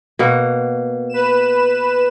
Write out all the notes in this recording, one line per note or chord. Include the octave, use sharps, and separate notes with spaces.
B2 A#3 F#4
B4 E7